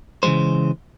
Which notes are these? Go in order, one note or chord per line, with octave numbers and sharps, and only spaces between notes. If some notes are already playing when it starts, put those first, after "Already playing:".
C#3 E3 F3 G#3 C5